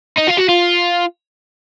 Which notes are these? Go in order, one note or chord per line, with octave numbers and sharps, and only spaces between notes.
D#4
F4
F#4
F4